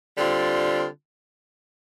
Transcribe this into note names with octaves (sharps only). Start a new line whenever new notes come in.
D3 G3 C4 F4